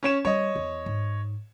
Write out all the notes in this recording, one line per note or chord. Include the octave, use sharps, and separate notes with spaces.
C#4 C#5 E7
G3 C#5 D#5
E2
G#2